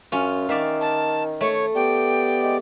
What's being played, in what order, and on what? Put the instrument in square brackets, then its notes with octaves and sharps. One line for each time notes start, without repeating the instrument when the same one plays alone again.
[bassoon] F#2 [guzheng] C#4 F4
[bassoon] D#3 [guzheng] D5 E5 F5
[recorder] A5
[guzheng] A3 [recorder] C#5
[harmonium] B3 G4 D5 [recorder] G5
[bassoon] G#3